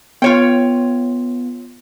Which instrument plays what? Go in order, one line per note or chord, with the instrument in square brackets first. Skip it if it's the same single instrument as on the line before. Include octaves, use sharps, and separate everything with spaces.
[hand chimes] B3 [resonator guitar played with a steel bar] F4 C#5 G5